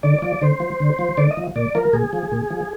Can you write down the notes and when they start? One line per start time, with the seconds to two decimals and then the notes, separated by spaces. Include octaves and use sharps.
0.03 D3 D5
0.22 F3 D5
0.42 D3 C5
0.60 F3
0.80 D3
0.99 F3
1.17 D3 D5
1.31 D#5
1.37 F3
1.56 A#2 D5
1.75 F3 A#4
1.93 A#2 G#4
2.13 F3
2.32 A#2
2.50 F3